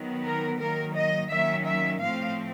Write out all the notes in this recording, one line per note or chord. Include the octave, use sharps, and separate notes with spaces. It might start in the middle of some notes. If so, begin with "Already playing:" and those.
Already playing: D#3 F#3 B3
A#4
D#3 F#3 A#3 A#4
D#5
D#3 F#3 A#3 C#4 E5
E5
A2 F3 A3 C4 F5